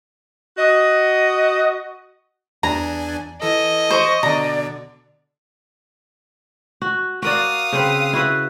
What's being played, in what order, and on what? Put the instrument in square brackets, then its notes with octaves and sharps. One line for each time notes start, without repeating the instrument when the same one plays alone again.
[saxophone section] F#4 D#5
[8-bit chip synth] E2 D4 G#5 [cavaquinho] A#5
[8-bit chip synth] E3 A4 [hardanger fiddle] D#5
[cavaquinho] C5 [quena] C#6
[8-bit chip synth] B2 D3 [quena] D5 [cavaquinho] A#5
[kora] F#4
[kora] F#4 A#4 D5 [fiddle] F5 D#6
[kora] C#3 C4 B4
E4 F#4 B4